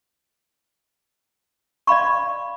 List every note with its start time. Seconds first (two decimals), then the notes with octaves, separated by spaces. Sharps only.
1.87 D5 F5 B5 C#6